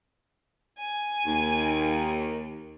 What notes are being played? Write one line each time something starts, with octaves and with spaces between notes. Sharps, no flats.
G#5
D#2